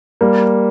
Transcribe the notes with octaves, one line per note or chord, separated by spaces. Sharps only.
G3 A#3